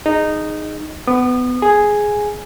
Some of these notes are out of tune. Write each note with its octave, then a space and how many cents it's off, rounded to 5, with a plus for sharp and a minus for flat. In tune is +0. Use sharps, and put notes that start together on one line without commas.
D#4 -10 G#4 +0
B3 +20 D#6 -35
G#4 +5 G#5 +0